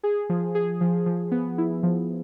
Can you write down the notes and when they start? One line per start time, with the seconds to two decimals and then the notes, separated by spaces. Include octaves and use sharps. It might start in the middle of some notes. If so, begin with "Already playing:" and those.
0.03 G#4
0.29 F3
0.55 G#4
0.81 F3
1.06 F3
1.31 B3
1.58 E4
1.83 F3